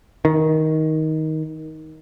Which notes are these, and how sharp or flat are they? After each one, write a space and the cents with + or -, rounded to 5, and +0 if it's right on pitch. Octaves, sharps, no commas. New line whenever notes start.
D#3 +15